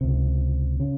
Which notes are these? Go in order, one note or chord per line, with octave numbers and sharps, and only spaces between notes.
C#2 C3
C#3